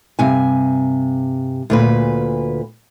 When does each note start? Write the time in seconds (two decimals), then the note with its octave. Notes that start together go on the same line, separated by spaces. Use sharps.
0.19 G2 C3 G#5
1.70 D2 A#2 B4